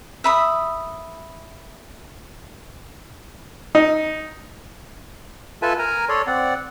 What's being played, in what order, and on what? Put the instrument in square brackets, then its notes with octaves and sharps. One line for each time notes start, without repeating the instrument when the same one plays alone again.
[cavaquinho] E5 B5 D#6
[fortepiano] D#4
[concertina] F4 A4 B4 E5 G#5 A5
A#4 G#5 A#5
A4 C#5 D5 C6
C4 D5 F#5